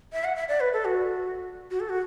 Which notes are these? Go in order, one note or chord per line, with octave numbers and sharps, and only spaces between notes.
E5
F#5
E5
D5
B4
A4
F#4
F#4
A4
F#4